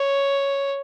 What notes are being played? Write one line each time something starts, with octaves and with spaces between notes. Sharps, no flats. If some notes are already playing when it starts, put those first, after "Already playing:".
Already playing: C#5